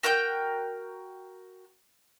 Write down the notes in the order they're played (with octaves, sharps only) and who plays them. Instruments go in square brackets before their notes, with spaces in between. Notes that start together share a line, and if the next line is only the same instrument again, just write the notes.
[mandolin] F#4 A#4 G5 G6